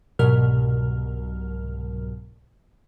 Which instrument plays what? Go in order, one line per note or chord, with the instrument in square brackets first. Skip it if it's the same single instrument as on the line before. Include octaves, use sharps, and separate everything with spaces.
[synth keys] C2 G#2 B2 F#3 A#4 F6